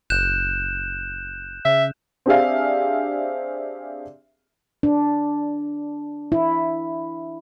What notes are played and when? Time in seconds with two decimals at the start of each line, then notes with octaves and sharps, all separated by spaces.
0.10 F#1 F#6 G6 E7
1.65 C#3 E5
2.26 C4 D4 G4 G#4 E5 F5
4.83 D4
6.32 E4